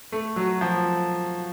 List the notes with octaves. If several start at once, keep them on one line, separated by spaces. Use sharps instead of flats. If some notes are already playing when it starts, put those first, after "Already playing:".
A3
F#3
F3